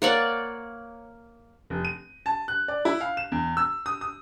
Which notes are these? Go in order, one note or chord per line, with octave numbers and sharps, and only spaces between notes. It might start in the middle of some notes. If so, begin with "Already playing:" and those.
A#3 C#5 D5 F#5
F1
D#7
A5
F#6
D5
E4
F5
E7
E2
E6
D#6
D#6